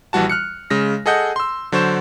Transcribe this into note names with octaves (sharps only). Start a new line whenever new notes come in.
A#1 E3 G3 F#4 A5
F6 F#6 C#7
C#3 G#3 A#6
G#4 A4 D#5 F#5 G6
C6 E6
D3 F#3 C5 C#6 G6 E7